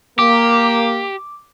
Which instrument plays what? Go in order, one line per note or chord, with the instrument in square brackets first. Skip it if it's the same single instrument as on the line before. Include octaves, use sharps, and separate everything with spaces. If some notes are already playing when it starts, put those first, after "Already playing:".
[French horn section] A#3 [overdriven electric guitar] G4 [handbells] D6